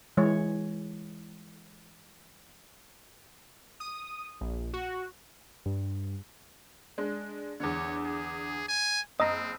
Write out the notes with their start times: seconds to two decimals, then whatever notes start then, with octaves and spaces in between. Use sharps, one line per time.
0.17 E3 G#3 C#5
3.80 D#6
4.41 A#1
4.73 F#4
5.66 G2
6.98 G#3 D4
7.60 E2 D3 C#5
8.04 G#4
8.68 G#5
9.20 F#1 C4 D#5 A#5 D#6 E6